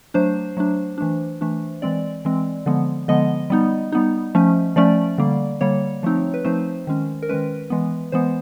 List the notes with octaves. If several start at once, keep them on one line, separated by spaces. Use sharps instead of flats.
F#3 A3 D4 C5
F#3 A3 D4
E3 A3 D4
E3 A3 D4
E3 G#3 C4 D5
E3 G#3 C4
D3 F3 G#3 B3
D3 F3 G#3 B3 D#5
G3 B3 D#4
G3 B3 D#4
F3 A3 C#4
F3 A3 C#4 D5
D3 G3 A#3
D3 G3 A#3 C#5
F3 A3 C4 D#4
B4
F3 A3 C4 D#4 C5
D#3 G#3 C#4
A#4
D#3 G#3 C#4 B4
E3 G#3 B3
E3 G#3 B3 C5